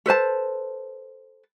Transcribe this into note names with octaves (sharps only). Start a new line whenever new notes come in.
A4 B4 C5 A5